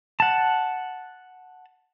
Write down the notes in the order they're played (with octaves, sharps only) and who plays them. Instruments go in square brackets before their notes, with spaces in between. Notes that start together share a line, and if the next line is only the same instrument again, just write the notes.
[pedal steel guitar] F#5 A5